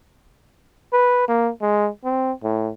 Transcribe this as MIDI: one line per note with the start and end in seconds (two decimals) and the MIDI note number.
0.93 1.24 71
1.28 1.50 58
1.61 1.89 56
2.05 2.32 60
2.43 2.71 45